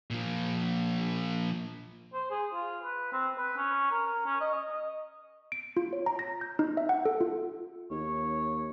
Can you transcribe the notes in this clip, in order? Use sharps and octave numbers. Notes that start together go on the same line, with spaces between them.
A#2 F3
C5
G#4
F4
B4
C4
B4
C#4
A#4
C#4
D#5
D#5
D#5
D7
F4
C#5
A#5
A#6
G6
D#4
E5
F#5
A4
F4
D#2 C#5